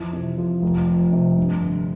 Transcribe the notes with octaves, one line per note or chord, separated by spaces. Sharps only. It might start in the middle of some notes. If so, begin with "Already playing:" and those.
Already playing: F2 E3
C3
F3
F1
F2
C3
G2
D3